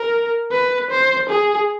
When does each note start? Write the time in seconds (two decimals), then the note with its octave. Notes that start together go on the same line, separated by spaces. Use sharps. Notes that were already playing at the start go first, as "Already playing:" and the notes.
Already playing: A#4
0.51 B4
0.91 C5
1.29 G#4